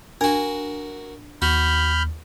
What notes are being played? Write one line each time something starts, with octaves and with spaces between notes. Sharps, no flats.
D4 F#4 A#4
D#2 F#4 B5 F6 G6